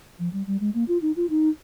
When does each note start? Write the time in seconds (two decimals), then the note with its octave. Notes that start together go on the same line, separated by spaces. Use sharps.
0.19 F3
0.33 G3
0.47 G3
0.61 G#3
0.74 A#3
0.88 F4
1.02 D#4
1.16 F4
1.30 D#4